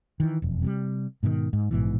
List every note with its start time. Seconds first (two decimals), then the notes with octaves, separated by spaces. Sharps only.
0.20 D#3 E3
0.42 E1 F2
0.62 C3 F#3 G3
1.23 G#2 B2 D3 D#3
1.53 G#2
1.71 A#1 G#2 B2 E3